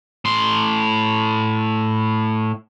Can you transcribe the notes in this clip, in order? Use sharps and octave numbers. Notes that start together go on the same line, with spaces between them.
A2 C6